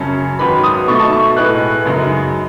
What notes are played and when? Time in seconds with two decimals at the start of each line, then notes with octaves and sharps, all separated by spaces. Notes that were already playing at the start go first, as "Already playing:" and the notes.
Already playing: F#2 C#3 F#3 C#4 A5
0.39 G#2 D#3 F#3 B3 D#4 B5
0.63 D#6
0.88 B2 A3 D#4 C#6
1.00 A5
1.12 C#6
1.37 A2 G#3 B3 F#6
1.85 F#2 C#3 G#3 D#4